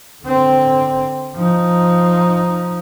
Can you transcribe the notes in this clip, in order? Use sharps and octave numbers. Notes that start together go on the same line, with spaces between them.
D3 C4
F3 D#4